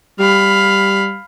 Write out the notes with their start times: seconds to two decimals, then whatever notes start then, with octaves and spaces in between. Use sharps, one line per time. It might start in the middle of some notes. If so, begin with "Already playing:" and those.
0.19 G3 F5 B5